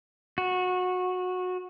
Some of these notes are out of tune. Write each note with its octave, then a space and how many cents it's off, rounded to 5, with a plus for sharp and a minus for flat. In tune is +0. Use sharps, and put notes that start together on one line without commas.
F#4 -20